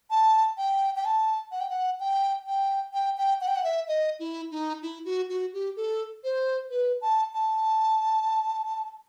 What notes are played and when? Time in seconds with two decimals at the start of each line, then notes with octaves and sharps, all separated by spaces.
0.10 A5
0.58 G5
0.96 G5
1.05 A5
1.52 F#5
1.60 G5
1.69 F#5
2.00 G5
2.47 G5
2.94 G5
3.17 G5
3.41 F#5
3.47 G5
3.56 F#5
3.64 E5
3.88 D#5
4.19 E4
4.51 D#4
4.82 E4
5.05 F#4
5.29 F#4
5.53 G4
5.76 A4
6.24 C5
6.71 B4
7.02 A5
7.34 A5